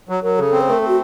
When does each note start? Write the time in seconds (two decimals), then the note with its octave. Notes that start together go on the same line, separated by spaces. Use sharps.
0.09 F#3
0.23 F#3 A#4
0.38 C#3 A4
0.52 C4
0.61 C5
0.68 A3 A#4
0.79 C4 A4
0.88 F#4